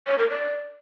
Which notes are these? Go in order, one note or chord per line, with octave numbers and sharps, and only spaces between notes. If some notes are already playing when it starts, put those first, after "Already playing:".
C#5
A#4
D5